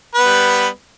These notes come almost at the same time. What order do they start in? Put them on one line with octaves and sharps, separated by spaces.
B4 B3 G3